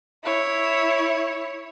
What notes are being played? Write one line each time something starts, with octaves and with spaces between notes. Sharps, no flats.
E4 C#5